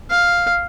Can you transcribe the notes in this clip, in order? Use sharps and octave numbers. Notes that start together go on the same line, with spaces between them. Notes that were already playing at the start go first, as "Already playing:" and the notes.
F5